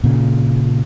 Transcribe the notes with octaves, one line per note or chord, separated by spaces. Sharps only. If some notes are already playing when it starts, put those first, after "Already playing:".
A#2 C#3